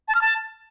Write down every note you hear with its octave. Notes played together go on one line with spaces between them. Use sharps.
A5
F6
A5